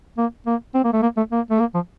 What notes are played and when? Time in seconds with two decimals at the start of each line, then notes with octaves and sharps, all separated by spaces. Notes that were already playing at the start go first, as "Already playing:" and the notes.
0.18 A#3
0.47 A#3
0.74 C4
0.84 A#3
0.93 A3
1.02 A#3
1.17 A3
1.32 A#3
1.50 A3
1.60 A#3
1.74 F3